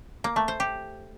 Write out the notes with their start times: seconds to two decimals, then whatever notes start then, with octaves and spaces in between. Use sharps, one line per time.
0.24 A#3
0.36 A3
0.48 C5
0.60 G4